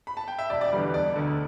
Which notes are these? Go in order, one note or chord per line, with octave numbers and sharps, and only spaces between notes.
B5
A5
G5
E5
E1 D5
D5
E2 D3 G3
B4
E1 D5
D2 D3